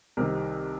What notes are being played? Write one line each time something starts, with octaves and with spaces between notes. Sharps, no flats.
C2 C3 D#3 A#4